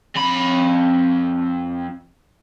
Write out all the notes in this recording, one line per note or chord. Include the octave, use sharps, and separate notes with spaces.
F2 B5